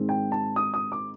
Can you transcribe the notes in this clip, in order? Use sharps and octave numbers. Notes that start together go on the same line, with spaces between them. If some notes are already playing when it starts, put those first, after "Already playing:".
Already playing: G#2 D#3 G#3 C4
G5
A5
D#6
D#6
D6